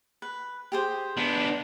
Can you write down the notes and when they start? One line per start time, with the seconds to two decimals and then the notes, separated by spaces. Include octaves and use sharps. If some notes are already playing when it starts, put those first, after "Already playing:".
0.22 B4
0.72 G4 G#4 C5
1.17 B3 D4